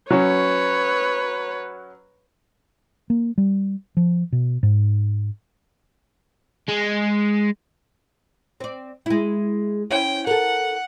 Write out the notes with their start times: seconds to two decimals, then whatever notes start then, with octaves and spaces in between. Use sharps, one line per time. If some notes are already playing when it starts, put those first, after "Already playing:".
0.11 F#3 C#4 B4 C#5
3.10 A#3
3.38 G3
3.97 F3
4.32 B2
4.63 G#2
6.68 G#3
8.60 C4 D5
9.06 G#3 E4
9.91 C#4 E4 C5 G5
10.27 A4 A#4 F#5